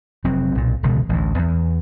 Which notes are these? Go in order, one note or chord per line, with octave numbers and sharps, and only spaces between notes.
F1 F#3 C4
B1 A#2
E1 C#2 B2 D3
A1 D2
E2